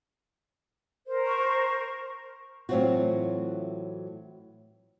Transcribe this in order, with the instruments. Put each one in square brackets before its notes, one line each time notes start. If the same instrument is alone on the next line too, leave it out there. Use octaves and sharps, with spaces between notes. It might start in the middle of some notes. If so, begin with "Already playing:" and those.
[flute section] A#4 C5
[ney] C#6
[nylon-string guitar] A2 E3 F#3 C4 F4 F#4